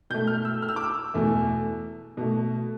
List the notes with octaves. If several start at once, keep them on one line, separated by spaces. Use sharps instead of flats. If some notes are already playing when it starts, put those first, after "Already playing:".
B2 A3 G6
F6
E6
F6
E6
D6
E6
E2 B2 A3
B2 A3